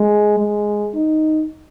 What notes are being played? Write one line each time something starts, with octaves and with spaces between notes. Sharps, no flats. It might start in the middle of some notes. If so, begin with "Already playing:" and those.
Already playing: G#3
G#3
D#4